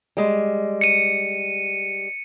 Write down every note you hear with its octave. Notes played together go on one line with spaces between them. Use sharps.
G3 G#3
C#7 D#7